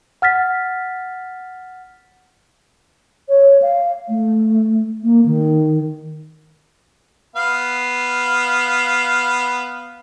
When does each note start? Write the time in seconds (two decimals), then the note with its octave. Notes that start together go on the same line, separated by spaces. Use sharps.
0.22 F#5 F6 A6 B6
3.29 C#5
3.62 F5
4.09 A3
5.03 A#3
5.26 D#3
7.36 B3 F5